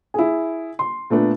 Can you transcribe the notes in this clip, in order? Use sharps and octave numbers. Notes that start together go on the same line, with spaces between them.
E4 G#4
C6
A#2 A3 B3 D4